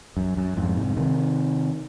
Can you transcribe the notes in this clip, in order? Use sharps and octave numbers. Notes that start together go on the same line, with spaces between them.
F#2
F#2
F2 G#2
G#2 C3
C3 D#3